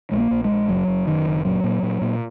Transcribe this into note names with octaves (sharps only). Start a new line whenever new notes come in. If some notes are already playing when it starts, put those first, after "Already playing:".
A#1 G#3
A#3
A#1
G#3
A#1
F#1 F#3
F#1
F#2 D#3
F#1
A#2 F#3
A#2
A#2
A#2